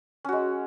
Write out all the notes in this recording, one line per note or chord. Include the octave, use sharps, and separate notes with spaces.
G#3 C#4 F#4